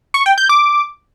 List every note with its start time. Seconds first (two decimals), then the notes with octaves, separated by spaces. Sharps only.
0.14 C#6
0.26 G5
0.38 G6
0.49 D6